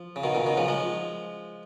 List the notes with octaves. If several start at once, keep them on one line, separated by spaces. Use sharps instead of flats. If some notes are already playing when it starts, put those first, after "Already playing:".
Already playing: F3
C#3
B2 D#3
A#2 C#3
B2 D#3
C#3 F3
F3 G#3